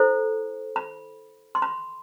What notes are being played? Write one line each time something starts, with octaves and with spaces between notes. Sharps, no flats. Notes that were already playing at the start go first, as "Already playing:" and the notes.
Already playing: E4 A4 C5
B5
C6
B5